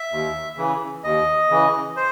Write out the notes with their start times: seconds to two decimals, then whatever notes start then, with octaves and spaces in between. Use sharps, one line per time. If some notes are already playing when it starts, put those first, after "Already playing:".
Already playing: E5
0.12 D#2
0.57 C#3 E3
1.04 D#2 D#5
1.50 C#3 E3
1.97 C5